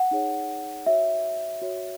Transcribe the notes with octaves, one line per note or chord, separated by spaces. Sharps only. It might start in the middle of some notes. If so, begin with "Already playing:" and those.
Already playing: F#5
D#4 G#4 C#5
F#4 C#5 E5
F#4 C#5